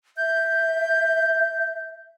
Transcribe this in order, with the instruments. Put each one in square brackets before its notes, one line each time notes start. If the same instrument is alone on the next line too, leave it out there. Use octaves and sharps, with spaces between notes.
[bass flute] E5 [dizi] G6